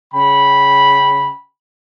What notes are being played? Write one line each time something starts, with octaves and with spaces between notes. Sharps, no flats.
C#3 G5 B5